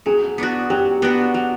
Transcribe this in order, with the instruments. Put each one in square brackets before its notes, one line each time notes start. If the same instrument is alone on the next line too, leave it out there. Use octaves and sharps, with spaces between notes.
[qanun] F#3 [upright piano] G#4
[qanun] B3 D4 F#4
[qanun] F#3 [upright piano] G4
[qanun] B3 D4 F#4
F#3